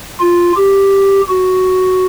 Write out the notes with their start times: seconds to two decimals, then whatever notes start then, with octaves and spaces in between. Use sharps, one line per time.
0.20 F4
0.56 G4
1.28 F#4